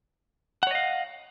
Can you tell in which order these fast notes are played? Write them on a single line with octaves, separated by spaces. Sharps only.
F#5 C#5 D#5 F5